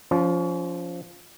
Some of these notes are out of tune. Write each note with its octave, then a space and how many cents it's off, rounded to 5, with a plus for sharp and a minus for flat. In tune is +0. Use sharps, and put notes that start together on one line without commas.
F3 +0 C#4 +35